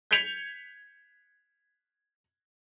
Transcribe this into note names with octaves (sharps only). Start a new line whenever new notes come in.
G6 G#6 B6 C#7 F7